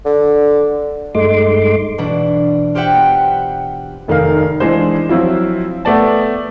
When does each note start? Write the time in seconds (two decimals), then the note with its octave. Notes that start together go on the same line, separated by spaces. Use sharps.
0.05 D3
1.15 G2 G#3 A3 D#4 C6 D6
1.98 B2 E3 D4 E4
2.75 F4 G4 C5 E5 F#5 G5
2.94 B3
4.08 F1 D#3 A#4 F5
4.60 E3 G#3 D4 G#4 C5
5.09 F3 F#3 C4 E4 F4
5.85 A3 B3 D5 A5